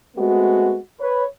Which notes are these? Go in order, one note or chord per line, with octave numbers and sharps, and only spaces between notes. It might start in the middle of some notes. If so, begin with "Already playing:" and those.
G#3 A3 B3 C4 F#4
B4 C#5